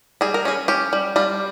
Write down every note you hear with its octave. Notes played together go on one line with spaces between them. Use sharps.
G3 G#4
A#4
C#4 G#4
C#4 G4
G3
G3 F4